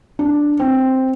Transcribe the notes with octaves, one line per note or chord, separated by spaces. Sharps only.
D4
C4